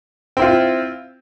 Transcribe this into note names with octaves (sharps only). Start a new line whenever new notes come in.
C4 E4 F4